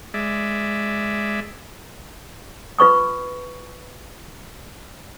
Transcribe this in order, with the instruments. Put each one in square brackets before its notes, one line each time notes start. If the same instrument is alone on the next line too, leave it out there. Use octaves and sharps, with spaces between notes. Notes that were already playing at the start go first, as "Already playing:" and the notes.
[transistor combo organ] G#3 D5 E5
[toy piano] F4 B4 C#6 D#6